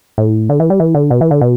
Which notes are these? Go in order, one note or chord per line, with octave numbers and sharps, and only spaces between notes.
A2
D3
E3
G3
E3
D3
B2
E3
D3
B2